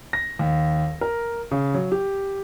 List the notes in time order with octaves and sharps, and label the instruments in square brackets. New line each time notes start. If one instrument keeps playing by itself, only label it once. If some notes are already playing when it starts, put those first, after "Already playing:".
[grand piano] A#6
D#2
A#4
C#3
F#3
G4